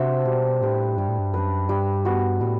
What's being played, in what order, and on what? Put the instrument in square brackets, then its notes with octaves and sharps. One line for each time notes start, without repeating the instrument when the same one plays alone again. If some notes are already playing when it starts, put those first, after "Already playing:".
Already playing: [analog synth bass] C3 [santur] D4 F#4 C5 E5
[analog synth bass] B2 [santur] G3
[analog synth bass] A2 [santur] D4 G4 B4
[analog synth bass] G2 [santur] G3
[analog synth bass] A2
G2
[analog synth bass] F#2 [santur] D4 G4 B4
[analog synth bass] G2 [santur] G3
[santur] B3 F#4
[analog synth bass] A2 [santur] G3